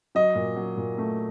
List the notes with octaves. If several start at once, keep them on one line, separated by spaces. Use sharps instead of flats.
F#3 D#5
A#2
F#3
A#2
A3